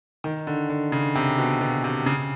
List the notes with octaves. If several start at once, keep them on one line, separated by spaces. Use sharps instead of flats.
D#3
D3
D3
C#3
C3
B2
B2
C3
C#3